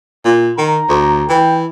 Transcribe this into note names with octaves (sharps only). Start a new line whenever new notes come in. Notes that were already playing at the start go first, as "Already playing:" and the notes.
A#2
D#3 A#5
D2
E3 G5